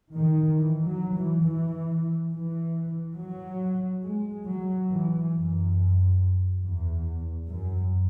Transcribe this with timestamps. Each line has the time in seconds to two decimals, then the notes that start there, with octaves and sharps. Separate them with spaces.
0.16 D#3
0.58 E3
0.87 F#3
1.16 E3
1.44 E3
2.31 E3
3.17 F#3
4.03 G#3
4.46 F#3
4.90 E3
5.33 F#2
6.62 E2
7.49 F#2